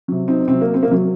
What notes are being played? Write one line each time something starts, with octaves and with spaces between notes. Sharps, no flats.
C3 F#3
C4 D#4
C3 F#3 C4
A#3
C4
A#3
C3 F#3